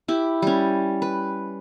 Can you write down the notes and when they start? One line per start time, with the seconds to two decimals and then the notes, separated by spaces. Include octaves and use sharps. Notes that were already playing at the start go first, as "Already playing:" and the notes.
0.08 E4 G4
0.42 G3 C#4
1.02 B4